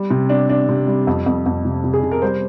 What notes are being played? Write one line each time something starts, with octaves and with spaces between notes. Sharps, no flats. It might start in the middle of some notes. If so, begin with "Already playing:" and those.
Already playing: G3
C3
D4
D4
C3
G3
F2
F2
F2
C3
C3
G#4
C3
A#4
G3 C5